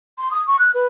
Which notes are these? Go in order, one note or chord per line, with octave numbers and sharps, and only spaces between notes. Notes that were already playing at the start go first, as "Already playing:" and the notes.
C6
D#6
C#6
F#6
B4